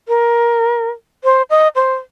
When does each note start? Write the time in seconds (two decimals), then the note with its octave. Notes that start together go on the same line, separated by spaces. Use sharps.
0.08 A#4
1.24 C5
1.50 D#5
1.75 C5